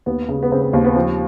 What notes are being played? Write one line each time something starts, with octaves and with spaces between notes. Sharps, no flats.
D#2 B3
C#3
B3
C#3 C4
C4
D#2 C4
B3
F3 C4